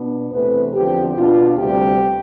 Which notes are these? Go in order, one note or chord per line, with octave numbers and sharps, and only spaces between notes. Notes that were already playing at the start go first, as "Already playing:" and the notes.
Already playing: B2 B3 D4
E2 C3 E3 A3 C4 B4
E2 D3 F3 C4 G4
B2 B3 D4 F4
D2 C3 G3 G4